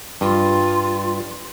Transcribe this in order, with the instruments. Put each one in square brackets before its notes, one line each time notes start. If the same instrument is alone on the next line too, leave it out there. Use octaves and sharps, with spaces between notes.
[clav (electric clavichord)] G2 [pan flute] F4